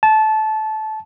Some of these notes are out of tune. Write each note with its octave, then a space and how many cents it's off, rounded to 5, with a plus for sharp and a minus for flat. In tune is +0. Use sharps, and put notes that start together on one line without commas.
A5 -20